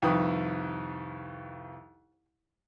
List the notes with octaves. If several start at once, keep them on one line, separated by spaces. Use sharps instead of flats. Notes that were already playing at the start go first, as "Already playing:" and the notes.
C2 F2 D#3 B4 D#6